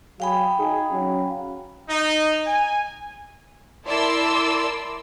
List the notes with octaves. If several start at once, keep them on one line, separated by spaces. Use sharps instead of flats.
F#3 G#4 F5 G5 B5
D#4 G#4
F#3 C#4
D#4
G#5
E4 A#4 D5 A5 C6 E6